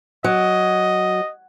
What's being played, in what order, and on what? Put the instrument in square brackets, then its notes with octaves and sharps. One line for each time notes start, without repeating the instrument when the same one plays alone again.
[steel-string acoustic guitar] F#3 [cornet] D#5